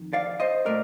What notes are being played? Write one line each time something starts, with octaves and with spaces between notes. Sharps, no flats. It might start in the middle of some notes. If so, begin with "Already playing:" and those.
Already playing: F2 D#3
D5 F5
C5 D#5
A#2 A3 A#4 D5